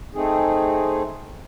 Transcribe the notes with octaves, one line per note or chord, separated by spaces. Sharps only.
A3 C4 D#4 G#4